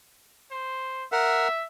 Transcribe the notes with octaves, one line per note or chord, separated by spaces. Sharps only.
C5
A#4 E5 F#5